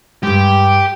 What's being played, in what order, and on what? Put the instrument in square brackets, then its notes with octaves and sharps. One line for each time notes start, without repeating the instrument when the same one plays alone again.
[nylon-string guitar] G2 G#3 [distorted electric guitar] G4